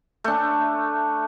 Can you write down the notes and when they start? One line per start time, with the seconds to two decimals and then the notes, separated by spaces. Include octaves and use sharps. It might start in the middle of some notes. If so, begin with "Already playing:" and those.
0.24 A3 D4